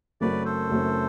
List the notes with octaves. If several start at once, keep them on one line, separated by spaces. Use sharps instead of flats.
F#1 F#2 F#3 A3 C4 B4 D5
A4 C5
F#1 F#2 F#3 A3 C4